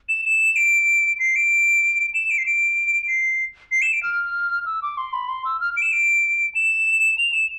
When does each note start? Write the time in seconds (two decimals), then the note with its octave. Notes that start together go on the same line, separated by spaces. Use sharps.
0.09 E7
0.25 E7
0.56 D7
1.20 C7
1.35 D7
2.14 E7
2.30 D7
2.38 C7
2.46 D7
3.08 C7
3.71 C7
3.82 E7
3.93 D7
4.03 F6
4.66 E6
4.82 D6
4.97 C6
5.13 B5
5.29 C6
5.45 E6
5.60 F6
5.77 D7
5.82 E7
5.92 D7
6.55 E7
7.18 F7
7.33 E7